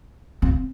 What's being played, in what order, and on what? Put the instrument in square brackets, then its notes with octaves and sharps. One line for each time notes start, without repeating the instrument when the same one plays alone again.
[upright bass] C4